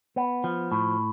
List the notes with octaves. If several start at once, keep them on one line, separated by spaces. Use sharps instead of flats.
B3
F3
A2